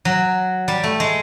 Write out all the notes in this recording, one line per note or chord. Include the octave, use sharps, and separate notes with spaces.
F#3
G3
A3
G#3